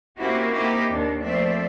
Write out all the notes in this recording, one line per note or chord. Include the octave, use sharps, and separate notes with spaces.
A#3 C4 C#4 E4 F#4 G4
A#3 C4 D#4 E4 G4
D#2 D4
F3 A3 C4 D5 E5